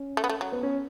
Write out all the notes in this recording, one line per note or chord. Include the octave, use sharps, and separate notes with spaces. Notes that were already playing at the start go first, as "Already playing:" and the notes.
Already playing: C#4
A3
B3
A3
F#3
B3
C#4